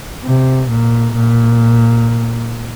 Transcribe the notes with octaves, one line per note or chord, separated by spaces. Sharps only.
C3
A#2
A#2